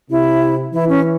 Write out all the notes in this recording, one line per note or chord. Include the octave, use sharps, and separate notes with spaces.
C3 E4
E3 E4
C#4